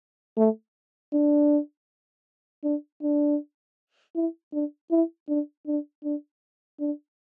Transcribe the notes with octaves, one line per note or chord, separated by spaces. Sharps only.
A3
D4
D4
D4
E4
D4
E4
D4
D4
D4
D4